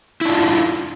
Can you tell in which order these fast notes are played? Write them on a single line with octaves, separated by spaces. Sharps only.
E4 D4 F4